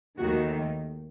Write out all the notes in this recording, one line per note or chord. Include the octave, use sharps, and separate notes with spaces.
D#2 D#3 A3 F#4